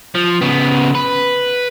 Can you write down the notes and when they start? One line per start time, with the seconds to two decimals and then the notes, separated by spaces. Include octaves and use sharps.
0.15 F3
0.41 C#3 B3
0.95 B4